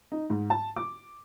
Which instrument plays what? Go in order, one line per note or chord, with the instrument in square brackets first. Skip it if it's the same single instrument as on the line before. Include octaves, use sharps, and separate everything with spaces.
[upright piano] D#4
G#2
A5
D6